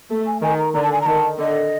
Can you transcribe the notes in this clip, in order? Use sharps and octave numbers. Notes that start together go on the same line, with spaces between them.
A3
G#5
D#3 G#5
A#5
D3 A#5
A5
G#5
A#5
D#3 A5
D3 D#5